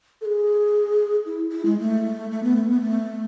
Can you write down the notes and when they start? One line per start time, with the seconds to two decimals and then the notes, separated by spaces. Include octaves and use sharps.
0.21 A4
0.25 G#4
1.26 E4
1.52 E4
1.65 G#3
1.79 A3
2.31 A3
2.43 B3
2.56 A3
2.69 B3
2.81 A3